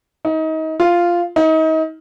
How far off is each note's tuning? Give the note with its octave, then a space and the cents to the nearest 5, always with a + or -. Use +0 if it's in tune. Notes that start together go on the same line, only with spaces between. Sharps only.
D#4 +30
F4 -5
D#4 +35